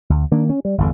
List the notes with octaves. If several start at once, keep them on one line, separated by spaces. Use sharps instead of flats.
D2
D#3 A#3 D4
C#4
G3
G1 E2 D3